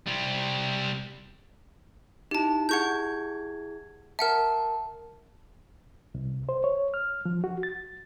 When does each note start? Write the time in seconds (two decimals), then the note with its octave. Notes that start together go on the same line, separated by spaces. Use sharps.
0.07 C3 G3
2.31 D#4 E4 G4 A5
2.69 E4 G#4 F#5 C#6 G6 G#6
4.19 A#4 E5 F#5 A5 F6
6.15 C2
6.49 C5
6.64 C#5
6.94 F6
7.25 F3
7.44 F#4
7.63 A6